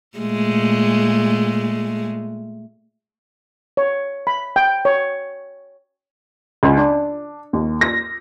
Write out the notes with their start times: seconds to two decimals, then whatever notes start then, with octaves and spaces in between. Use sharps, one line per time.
0.18 A#2 G#3 A3
3.77 C#5
4.27 B5
4.56 G5
4.85 C#5
6.63 C#2
6.77 D4
7.53 D#2
7.81 A#6